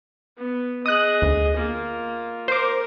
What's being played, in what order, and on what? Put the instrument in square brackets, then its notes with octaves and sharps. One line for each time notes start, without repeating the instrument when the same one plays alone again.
[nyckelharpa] B3
[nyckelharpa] G#4 D#5 [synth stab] D#6 F#6
[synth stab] D2
[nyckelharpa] A#3 F4
[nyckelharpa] A#4 [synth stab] C5 D6